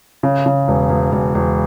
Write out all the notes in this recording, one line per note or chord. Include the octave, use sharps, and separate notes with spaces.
C#3
C#3
E1
E1
E1
E1